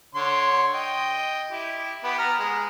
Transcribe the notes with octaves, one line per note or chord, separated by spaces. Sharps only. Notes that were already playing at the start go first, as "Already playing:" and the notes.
D3 C#5 C6
D#5 G5
E4 G4
B3 G4 B5
B3 A#5 F6
G#3